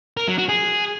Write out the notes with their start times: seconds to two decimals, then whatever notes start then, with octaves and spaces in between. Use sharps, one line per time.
0.17 A#4
0.28 F#3
0.38 F#4
0.49 G#4